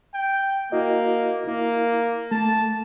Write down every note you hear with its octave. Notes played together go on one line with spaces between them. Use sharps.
G5
A#3 E4 F#4 D#5
A#3 E4
A3 A5